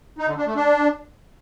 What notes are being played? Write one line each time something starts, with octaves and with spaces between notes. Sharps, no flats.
D#4
D3
D4
A3
D4